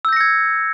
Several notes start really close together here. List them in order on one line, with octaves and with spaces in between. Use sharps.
E6 G6 A#6 C#7 G#6